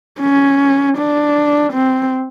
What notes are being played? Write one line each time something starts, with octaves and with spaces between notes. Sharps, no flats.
C#4
D4
C4